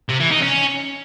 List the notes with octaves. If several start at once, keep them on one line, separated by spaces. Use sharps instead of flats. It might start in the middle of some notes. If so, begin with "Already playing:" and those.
C3
E3
D#4
C#4